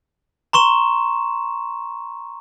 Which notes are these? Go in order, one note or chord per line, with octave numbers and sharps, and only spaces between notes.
A#5 C6 C#6 E7